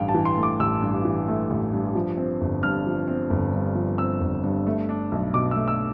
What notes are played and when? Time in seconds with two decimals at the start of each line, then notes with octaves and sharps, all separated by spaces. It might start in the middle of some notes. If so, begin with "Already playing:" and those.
Already playing: A1 G2 A3 F5 G5
0.08 A5
0.14 E3
0.25 C6
0.38 A3
0.43 D6
0.59 A1 E6
0.82 G2
1.05 E3
1.28 A3
1.50 A1
1.73 G2
1.95 F3
2.17 C4
2.41 G1
2.63 G2 F6
2.86 F3
3.08 C4
3.30 G1
3.54 G2
3.75 F3
3.98 C4 E6
4.21 G1
4.44 G2
4.67 A3
4.89 D4
5.12 B1
5.34 B2 D6
5.51 E6
5.56 A3
5.68 E6